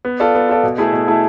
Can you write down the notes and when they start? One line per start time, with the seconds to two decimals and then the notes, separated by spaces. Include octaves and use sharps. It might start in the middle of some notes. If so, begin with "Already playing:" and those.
0.05 B3
0.20 F4 A4 D5
0.35 B3
0.49 F4 A4 D5
0.63 B2
0.78 A3 E4 G#4
0.93 B2
1.08 A3 E4 G#4